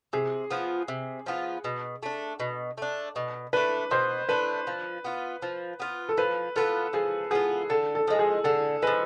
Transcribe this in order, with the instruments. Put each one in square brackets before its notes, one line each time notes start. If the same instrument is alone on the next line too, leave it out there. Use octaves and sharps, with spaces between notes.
[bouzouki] C3 [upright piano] G#4
[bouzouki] F3 B3 F4
C3
F3 B3 F4
B2
A3 D4
B2
A3 D4
B2
[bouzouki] A3 D4 [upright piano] B4
[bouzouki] B2 [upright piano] C5
[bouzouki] A3 D4 [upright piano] B4
[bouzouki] F3
B3 F4
F3
B3 F4
[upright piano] A4
[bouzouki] F3 [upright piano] B4
[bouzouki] B3 F4 [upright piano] A4
[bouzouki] F3 [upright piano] G#4
[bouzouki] B3 F4 [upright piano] G#4
[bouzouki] D3 [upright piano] A4
[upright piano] A4
[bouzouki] F3 G#3
[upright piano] G#4
[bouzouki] D3 [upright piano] A4
[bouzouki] F3 G#3 [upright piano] B4